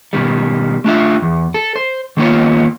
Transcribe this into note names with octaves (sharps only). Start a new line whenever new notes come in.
B2 D#3 G3
A3 D4 F4 E5
E2
A4
C5
D#3 A#3 B3 D#4 F4 C#5